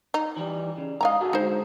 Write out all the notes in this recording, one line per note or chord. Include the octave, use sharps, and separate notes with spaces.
D#4
E3 G3
C#3
G#2 D#5 F5 G#5 A#5
F#4 G#4 A4
D3 G#3 D#4 C5